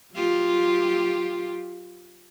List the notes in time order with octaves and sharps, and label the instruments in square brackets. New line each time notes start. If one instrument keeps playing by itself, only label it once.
[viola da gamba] F#3 F4 G4